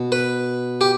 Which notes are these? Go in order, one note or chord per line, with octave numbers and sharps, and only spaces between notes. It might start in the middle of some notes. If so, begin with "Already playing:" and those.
Already playing: B2
B4
G4